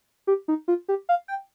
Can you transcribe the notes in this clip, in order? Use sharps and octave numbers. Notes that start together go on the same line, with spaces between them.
G4
D#4
F4
G4
F5
G5